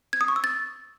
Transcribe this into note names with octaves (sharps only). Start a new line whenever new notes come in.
G#6
D#6
C#6
E6
A6